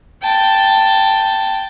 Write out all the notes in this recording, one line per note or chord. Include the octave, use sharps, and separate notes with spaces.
G5 A5